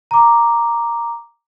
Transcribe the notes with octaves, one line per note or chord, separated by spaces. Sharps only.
A#5 D6